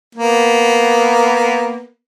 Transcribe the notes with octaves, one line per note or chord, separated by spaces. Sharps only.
A#3 B3